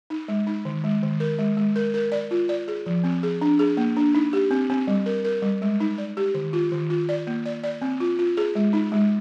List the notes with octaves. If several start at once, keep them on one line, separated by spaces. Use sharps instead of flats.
D#4
G#3
D#4
D#3
G#3
D#3
A#4
G#3
G#3
A#4
A#4
D5
F4
D5
G#4
F3
C4
G#4
D4
G#4
A#3
D4
D#4
G4
C4
C4
G3
A#4
A#4
G3
G#3
D#4
D5
G4
D#3
F4
D#3
F4
D5
A#3
D5
D5
C4
F4
F4
G#4
G#3
D#4
G#3